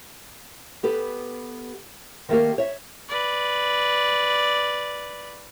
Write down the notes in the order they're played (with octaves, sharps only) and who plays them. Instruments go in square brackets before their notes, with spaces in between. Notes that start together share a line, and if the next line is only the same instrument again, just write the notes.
[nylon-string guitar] B3 G4 A4 B4
D#3 A3 A#3 G4 A#4
C#5 E5
[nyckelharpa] B4 D5